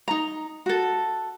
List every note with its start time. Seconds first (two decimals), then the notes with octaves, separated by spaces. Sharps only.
0.08 D#4 A#5
0.66 F#4 A4